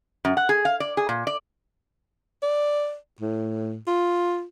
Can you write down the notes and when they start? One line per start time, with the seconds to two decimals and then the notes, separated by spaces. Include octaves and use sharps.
0.25 F#2
0.37 F#5
0.49 G#4
0.65 F5
0.80 D5
0.97 G#4
1.09 A#2
1.27 D5
2.43 D5
3.20 A2
3.87 F4